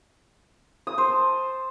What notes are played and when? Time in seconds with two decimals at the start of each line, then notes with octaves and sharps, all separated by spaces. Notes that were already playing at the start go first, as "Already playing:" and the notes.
0.87 D#6
0.98 C5
1.09 A5